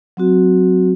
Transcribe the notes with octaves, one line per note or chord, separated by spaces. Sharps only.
F#3 C4 F#4